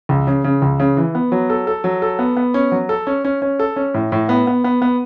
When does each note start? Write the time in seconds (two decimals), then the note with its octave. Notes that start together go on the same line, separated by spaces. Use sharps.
0.09 C#2
0.27 C#3
0.44 C#3
0.62 C#2
0.80 C#3
0.97 E3
1.15 B3
1.32 F#3
1.50 A4
1.67 A4
1.84 F#3
2.02 A4
2.19 B3
2.37 B3
2.54 C#4
2.72 F#3
2.89 A4
3.07 C#4
3.25 C#4
3.42 C#4
3.59 A4
3.76 C#4
3.94 A2
4.12 A2
4.29 B3
4.47 B3
4.64 B3
4.82 B3